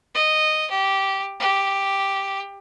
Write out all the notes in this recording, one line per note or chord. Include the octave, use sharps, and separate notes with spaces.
D#5
G4
G4